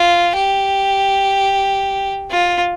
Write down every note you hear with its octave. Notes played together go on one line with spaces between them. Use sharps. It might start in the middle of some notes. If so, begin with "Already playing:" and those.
Already playing: F4
G4
F4